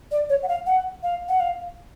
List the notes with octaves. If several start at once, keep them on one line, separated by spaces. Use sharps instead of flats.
D5
C#5
F#5
F5
F#5
F5
F#5
F5